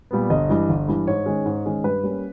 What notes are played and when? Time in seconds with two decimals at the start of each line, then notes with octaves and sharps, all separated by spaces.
0.11 A#2 G3 B3
0.30 G1 D#5
0.49 G2 E3
0.69 G1
0.88 G2 E3
1.07 G#2 C#5
1.26 D#3 G#3 C#4
1.46 G#2
1.65 D#3 G#3 C#4
1.84 G2 B4
2.03 G3 A#3 C#4